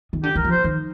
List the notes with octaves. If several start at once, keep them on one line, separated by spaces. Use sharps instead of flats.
D#3
D3 G4
D#3 A#4
F3
C5
D#3